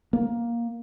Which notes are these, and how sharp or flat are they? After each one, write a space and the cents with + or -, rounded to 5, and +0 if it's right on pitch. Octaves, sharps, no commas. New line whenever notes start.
A#3 +10